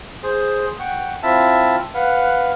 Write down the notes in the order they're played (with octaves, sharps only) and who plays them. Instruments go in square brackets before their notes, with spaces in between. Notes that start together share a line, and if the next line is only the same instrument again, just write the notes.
[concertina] G#4 C5
F#5 G5 C#6
C4 E4 F4 E5 A5
B4 F5 F#5